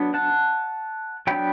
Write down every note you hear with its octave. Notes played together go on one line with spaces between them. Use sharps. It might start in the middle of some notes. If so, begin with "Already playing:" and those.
Already playing: F#3 B3 D4
F#5 A5
F#3 B3 D4 G5 B5